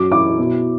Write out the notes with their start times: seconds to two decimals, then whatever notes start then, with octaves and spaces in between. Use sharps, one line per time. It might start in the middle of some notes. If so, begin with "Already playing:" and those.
Already playing: F#2 F#3 D6
0.12 E4 D6
0.38 B2